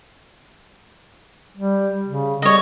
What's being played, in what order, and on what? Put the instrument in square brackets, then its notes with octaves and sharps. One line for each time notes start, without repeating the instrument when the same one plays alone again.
[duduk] G3
C#3
[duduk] G3 [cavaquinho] C#5 D#5